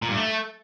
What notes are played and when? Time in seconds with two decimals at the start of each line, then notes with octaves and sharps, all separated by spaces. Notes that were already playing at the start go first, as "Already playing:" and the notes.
0.02 A#2
0.09 G2
0.16 A3